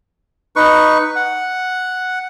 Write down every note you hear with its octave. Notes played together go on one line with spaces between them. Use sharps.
D#4 B4 C#6
F#5